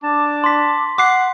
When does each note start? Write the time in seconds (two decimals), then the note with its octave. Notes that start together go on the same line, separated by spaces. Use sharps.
0.03 D4 A5 D6
0.44 C6 B6
0.98 F#5 D6 C7